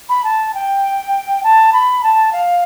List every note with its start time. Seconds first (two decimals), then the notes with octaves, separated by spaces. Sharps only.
0.09 B5
0.24 A5
0.54 G5
1.43 A5
1.73 B5
2.03 A5
2.32 F5